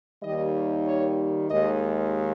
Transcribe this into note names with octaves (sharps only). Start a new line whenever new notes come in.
D#2 D#3 G3 D#5
C#5
D#2 D#3 G#3 D#5